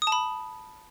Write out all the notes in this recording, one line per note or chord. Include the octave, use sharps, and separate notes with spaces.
D#6
A5
B5